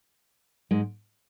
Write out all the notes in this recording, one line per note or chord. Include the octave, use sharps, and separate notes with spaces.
G#2 G#3